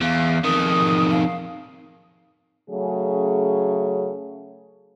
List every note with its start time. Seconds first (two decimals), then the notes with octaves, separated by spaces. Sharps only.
0.01 E2 F5
0.44 F2 D#3 D#6
1.11 F5
2.70 C#3 F#3 A3 C#4 G#4